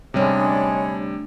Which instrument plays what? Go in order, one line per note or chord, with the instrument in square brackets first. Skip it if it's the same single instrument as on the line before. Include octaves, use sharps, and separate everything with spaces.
[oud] D2 C#4 [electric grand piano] C3 G3 [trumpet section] G#3 [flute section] D4 C#5 B5